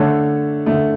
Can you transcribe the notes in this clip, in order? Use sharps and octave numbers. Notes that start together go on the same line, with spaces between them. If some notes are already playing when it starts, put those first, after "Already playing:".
Already playing: D3 A3 A4 C#5
D3 A3